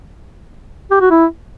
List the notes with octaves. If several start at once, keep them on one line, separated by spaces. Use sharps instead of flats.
G4
F#4
E4